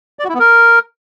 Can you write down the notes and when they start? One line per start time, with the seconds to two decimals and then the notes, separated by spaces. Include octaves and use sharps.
0.19 D5
0.24 F#4
0.29 E4
0.34 B3
0.40 A#4